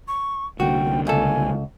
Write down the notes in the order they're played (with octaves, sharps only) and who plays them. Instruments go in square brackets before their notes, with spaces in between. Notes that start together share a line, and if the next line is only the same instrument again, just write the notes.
[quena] C#6
[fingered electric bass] C2 D3 A#3 [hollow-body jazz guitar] F#4 [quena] G5
[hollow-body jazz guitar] C#2 A4 [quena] G#5